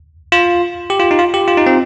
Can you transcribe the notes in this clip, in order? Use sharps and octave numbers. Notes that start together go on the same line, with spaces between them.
F4
G4
F4
D#4
F4
G4
F4
D#4
C4